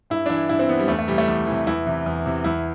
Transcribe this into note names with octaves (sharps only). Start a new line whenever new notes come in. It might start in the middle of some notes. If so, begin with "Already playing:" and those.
G2 E4
D4
E3 E4
G2 E4
C4
E3 B3
G3
E2 A3
A3
C3 E3 G3
A3
E2
C3 E3
E2 E4
C3 E3
E2
C3 E3
E2 E4